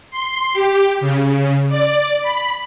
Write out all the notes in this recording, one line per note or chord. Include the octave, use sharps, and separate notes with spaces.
C6
G4
C#3
D5
B5